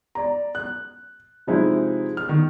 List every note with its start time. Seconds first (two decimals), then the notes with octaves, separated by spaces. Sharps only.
0.15 D5 A#5
0.55 F#6
1.47 C3 F3 G#3 D#4 E4
2.17 F6
2.29 D#3